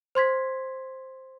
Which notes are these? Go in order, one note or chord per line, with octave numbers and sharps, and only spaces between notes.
C5 C6 G#6 B6